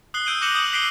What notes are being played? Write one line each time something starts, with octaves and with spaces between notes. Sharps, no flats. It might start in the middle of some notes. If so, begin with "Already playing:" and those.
D#6 F#6 C7 G7
E6 G6 D7 D#7 G7
D6 F#6 A#6 C#7 E7 F#7
D#6 E6 G6 F#7
F#6 B6 C7 D7 F#7 G7